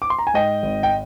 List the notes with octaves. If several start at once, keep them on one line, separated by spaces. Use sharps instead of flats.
D6
C6
A#5
G#5
G#2 D#5 G5
G#1
G5